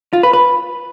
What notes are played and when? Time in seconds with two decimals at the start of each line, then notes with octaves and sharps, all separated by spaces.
0.13 F4
0.23 B4
0.33 B4